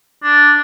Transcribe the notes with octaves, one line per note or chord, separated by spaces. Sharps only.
D4